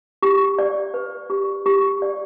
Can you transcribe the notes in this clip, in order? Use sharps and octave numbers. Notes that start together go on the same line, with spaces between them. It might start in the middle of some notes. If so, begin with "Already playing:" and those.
G4
D5
B4
G4
G4
D5